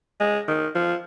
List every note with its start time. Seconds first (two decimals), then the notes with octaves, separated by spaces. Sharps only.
0.20 G#3
0.48 D#3
0.75 F3